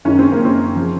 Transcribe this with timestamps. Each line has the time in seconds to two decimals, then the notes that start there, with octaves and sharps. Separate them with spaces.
0.05 F#2 D#3 C#4
0.19 C4
0.32 A#3
0.45 C4
0.76 C#3 F3